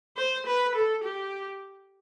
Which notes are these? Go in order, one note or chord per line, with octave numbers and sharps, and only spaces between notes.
C5
B4
A4
G4